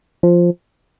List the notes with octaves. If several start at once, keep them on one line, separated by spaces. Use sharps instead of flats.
F3